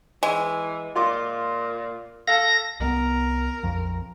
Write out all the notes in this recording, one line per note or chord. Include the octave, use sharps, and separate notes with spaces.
E3 G#3
A#2 F4 C6 D6
A4 F5 A5 A#6
C2 G3 B3 A#4
A#1 F2 F3